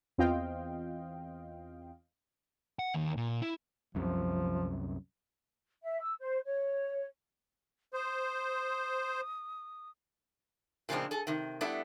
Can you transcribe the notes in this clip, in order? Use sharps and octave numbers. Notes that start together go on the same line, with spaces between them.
E2 C4 F4 D#5 F5 G5
F#5
D#2
A#2
E4
C2 F#2 C3 F3
E5
E6
C5
C#5
C5 D#6
A#2 C#3 F3 G#3 C4 D4
G#4 A4
C3 D#3
G3 A3 B3 D4 E4